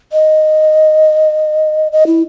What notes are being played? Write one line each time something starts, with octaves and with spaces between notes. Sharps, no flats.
D#5
D#5
E4